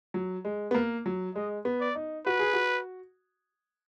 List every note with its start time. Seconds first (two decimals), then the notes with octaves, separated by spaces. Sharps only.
0.14 F#3
0.45 G#3
0.71 B3
0.74 A#3
1.06 F#3
1.35 G#3 D#5
1.65 B3
1.81 D5
1.95 D#4
2.26 F#4 B4
2.39 G#4
2.53 F#4